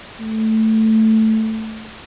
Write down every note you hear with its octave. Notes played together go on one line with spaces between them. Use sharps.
A3